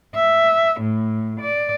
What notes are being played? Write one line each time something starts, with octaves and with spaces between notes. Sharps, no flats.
E5
A2
D5